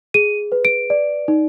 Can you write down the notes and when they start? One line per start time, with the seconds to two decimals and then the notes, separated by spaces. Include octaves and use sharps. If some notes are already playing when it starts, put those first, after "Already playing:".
0.14 G#4 D#7
0.52 B4
0.65 D7
0.90 D5
1.28 D#4